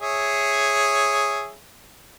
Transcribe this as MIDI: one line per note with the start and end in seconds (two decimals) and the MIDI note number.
0.01 1.53 68
0.01 1.53 73
0.01 1.53 76